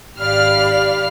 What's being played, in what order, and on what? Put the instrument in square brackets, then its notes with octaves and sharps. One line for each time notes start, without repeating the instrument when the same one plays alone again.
[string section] G#1 G4 D5 F5 B5 F6